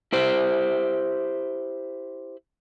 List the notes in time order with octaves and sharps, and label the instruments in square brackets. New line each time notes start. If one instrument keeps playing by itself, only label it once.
[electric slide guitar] E4 G4 C5